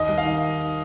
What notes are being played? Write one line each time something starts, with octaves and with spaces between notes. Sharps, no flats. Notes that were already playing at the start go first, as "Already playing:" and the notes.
Already playing: D#2 D#5
G3
F5
D#3